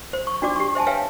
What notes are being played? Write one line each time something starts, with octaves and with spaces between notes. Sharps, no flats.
C5
C#6
D4 F#4 D5 D6
G4 C#6
C5 E5 G#5 A5
B4 C#5 E5 F5 G5 G#5